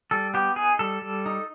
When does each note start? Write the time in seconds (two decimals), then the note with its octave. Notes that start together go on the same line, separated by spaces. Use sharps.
0.11 G3 A4
0.34 B3 G4
0.56 D#4 G#4
0.79 G3 A4
1.02 G3
1.26 D#4